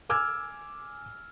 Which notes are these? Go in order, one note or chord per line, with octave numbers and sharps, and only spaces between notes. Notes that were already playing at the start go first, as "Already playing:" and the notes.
G#5 D6 E6 F6 G#6